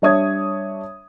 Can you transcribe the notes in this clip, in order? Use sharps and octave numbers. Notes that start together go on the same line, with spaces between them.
G3 D4 C#5 E5 D#6 G#6